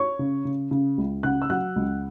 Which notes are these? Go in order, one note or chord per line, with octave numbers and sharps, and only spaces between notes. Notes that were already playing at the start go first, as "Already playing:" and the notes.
Already playing: C#5 C#6
C#3
C#3
C#3
C#2
C#3 F#5 F#6
E6
F#3 F#5 F#6
C#2